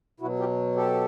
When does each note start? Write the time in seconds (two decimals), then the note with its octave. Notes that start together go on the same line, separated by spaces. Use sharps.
0.20 B2 F#3 E4 F#4
0.39 F4 G4
0.76 G4 A4